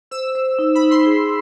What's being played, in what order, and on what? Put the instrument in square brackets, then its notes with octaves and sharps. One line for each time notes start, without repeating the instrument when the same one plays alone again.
[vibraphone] C5 [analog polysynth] E6
[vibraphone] C5
D#4
[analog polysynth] B5
[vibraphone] D#4
[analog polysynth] C6
[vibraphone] G#4